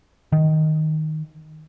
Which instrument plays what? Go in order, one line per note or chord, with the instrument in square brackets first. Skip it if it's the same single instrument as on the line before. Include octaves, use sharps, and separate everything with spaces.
[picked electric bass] D#3